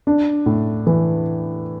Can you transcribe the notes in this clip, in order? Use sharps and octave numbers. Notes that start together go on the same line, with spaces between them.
D4
A2
E3